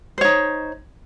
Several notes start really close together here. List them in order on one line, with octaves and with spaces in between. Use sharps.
C5 C#5 D#4